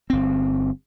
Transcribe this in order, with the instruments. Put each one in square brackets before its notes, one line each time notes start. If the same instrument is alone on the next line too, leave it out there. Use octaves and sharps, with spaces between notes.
[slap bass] G1 C4